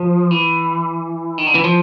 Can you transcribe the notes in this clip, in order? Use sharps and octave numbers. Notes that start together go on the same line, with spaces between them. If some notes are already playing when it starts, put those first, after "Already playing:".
Already playing: F3
E3
D#3
D3
E3
F3